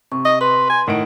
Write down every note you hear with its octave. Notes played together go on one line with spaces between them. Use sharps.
C3 C#6
D#5
B4 C6
G#5
A2 D#3 F#5 D7